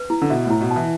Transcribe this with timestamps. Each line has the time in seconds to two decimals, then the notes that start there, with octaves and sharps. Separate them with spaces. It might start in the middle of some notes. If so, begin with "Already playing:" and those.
Already playing: B4
0.10 E4
0.22 D3
0.30 B2 E5
0.46 A2 E4
0.61 B2
0.71 A5
0.76 E3